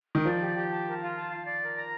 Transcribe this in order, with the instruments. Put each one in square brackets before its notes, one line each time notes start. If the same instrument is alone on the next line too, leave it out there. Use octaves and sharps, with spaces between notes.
[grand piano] D#3
[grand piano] F3 [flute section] D5
[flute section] G4
G4
A5
A#4
F4
A5
F5
D5
A#4
A#5